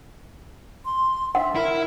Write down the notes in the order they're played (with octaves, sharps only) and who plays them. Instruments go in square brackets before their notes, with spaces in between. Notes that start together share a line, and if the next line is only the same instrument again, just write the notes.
[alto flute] C6
[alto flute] E5 [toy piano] F#5
[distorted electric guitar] E4 [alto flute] A#4